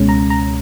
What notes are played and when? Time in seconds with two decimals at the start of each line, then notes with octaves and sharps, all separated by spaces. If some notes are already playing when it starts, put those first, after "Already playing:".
Already playing: C#2 B2 G#3 C#4
0.09 A#5
0.30 A#5